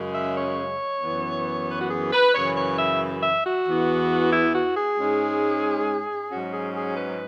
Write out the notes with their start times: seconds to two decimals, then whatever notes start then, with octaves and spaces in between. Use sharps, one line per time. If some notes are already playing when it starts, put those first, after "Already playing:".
Already playing: F#2 C#3 G#3 C#4
0.15 E5
0.37 C#5
1.03 F#2 E3 B3
1.69 B4
1.80 F#4
1.91 G#4
2.13 B4
2.35 F#2 C#3 E3 C#5
2.57 C#5
2.79 E5
3.23 E5
3.45 F#4
3.67 E2 E3 B3
4.33 E4
4.55 F#4
4.76 G#4
4.99 G#2 G#3 C#4
6.31 G#2 F#3 C#4 F#4
6.53 G#4
6.75 G#4
6.97 B4